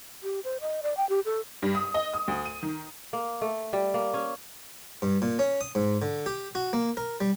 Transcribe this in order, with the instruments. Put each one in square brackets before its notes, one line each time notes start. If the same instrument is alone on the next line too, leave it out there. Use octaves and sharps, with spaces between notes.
[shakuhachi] G4
C5
D#5
D5
G5
G4
A4
[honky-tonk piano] G2
D#6
D#5
D#6
D2
D#7
D#3
[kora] A#3
A3
G3
A#3
C#4
[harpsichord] G2
A#2
C#4
D#6
G#2
D3
G4
F#4
A#3
A#4
G3